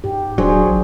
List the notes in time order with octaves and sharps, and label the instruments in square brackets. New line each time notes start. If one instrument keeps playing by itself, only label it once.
[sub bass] G#2 [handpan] G4
[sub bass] D#1 [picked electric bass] F#3 [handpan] D4 G#4 C5
[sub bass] A1